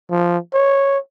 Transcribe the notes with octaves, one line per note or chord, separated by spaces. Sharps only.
F3
C#5